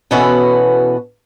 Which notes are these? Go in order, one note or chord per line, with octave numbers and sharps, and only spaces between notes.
B2 E3 B3 C#4 F#4 A4